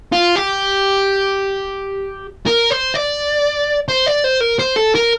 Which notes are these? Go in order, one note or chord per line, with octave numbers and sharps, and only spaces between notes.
F4
G4
A#4
C5
D5
C5
D5
C5
A#4
C5
A4
A#4